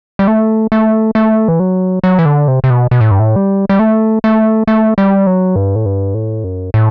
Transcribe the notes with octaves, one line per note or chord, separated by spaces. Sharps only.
G3
A3
A3
A3
E3
F#3
F#3
E3
D3
C3
C3
B2
B2
A2
G2
A2
G3
G3
A3
A3
A3
G3
F#3
G2
A2
G2
A2
F#2
A2